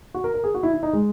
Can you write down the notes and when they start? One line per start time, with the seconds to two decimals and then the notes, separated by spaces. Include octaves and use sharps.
0.14 F#4
0.24 A#4
0.34 A#4
0.44 G#4
0.55 F#4
0.63 E4
0.74 E4
0.83 D#4
0.93 G#3